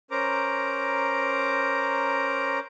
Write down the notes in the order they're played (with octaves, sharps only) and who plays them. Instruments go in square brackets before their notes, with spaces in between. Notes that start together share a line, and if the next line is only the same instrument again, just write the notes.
[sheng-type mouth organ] C#4 A#4 C5 A#5 D6